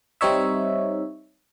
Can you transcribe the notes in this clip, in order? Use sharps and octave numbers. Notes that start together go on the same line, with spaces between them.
G3 C4 D#4 C#5 E5